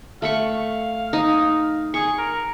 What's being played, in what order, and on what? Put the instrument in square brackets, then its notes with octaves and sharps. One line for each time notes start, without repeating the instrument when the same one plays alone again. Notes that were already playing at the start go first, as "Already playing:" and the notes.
[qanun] A3 B5 C#6 [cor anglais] F5
[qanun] D#4
[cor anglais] G#4 [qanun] C#6
[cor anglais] A#4